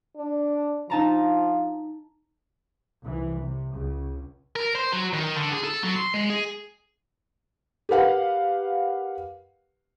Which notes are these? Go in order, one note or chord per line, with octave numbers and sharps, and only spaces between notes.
D4
F3 D#4 A5 A#5
C2 E3
C3
C#2 C#3
A#4
C5
F#3
D#3
D3
G#4
A4
F#3
C6
G#3
G#4
G4 A#4 B4 F5 F#5